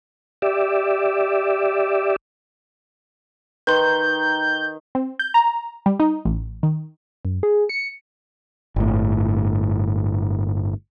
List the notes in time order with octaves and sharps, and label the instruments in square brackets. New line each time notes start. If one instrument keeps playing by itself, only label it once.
[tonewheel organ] G4 D5 E5
[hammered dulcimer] D#3 [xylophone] B4 C6 [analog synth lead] G6
[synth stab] C4
G6
A#5
G3
D#4
A1
D#3
[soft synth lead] F#2
G#4
C#7
[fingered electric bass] G1 A2